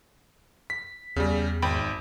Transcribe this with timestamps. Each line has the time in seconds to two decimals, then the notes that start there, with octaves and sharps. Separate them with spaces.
0.70 B6
1.16 E2 C#3 G3
1.62 G#1 G5 B5